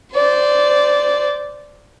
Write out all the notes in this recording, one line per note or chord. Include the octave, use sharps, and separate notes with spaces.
C5 D5